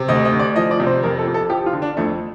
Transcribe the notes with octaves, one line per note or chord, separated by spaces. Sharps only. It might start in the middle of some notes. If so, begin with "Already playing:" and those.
Already playing: C3
D2 D#5
D#5
D2
D5
F3 D#5
D5
C3
C5
F2 A#4
A4
F2
A4
F3 G4
F4
D3
D4
F2 A3